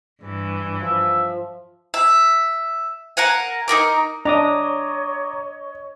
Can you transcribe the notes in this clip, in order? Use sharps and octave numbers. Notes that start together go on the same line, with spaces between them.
G2 E3
F3 E5
E5
A#4 F5 F#5 G#5
D#4 G#4 A#4 D6
D4 C#5 D#5 A#5 D6 D#6